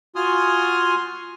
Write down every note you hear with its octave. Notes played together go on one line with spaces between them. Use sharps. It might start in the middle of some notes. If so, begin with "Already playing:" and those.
F4 F#4 G#5 C6 D#6 F6